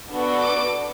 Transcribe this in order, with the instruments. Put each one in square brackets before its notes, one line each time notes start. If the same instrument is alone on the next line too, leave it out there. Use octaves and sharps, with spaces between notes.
[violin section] B3 D4 F#4 A4
D6